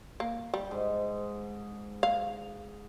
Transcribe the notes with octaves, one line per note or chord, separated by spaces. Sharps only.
A#3
G3
G#2
F5